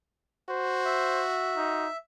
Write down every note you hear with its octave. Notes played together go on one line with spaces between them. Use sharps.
F#4 C5
E5
D#4